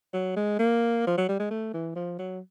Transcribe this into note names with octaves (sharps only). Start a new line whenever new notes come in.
F#3
G#3
A#3
F3
F#3
G3
G#3
A3
E3
F3
F#3